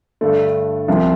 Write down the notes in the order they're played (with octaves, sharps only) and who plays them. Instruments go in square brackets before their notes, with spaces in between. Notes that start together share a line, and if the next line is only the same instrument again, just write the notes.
[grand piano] G2 D3 A3
C2 C3 F3